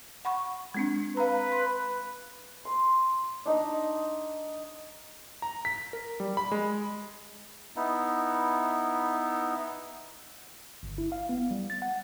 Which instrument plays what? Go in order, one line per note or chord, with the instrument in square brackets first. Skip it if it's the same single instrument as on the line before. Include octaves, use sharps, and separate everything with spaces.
[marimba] F#5 B5 C#6
G#3 C4 D4
[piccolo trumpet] B4 [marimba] F5 A#5
[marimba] C6
[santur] C6
D4 D#4 D#5
[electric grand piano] A#5
B6
A#4
G3
B5
G#3
[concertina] B3 D#4 E4
[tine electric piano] G1
E4
F5
B3
G3
A6
F#5